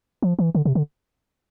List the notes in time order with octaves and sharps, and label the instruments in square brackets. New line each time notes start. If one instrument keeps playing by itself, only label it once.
[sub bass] F3
E3
D3
C3
D3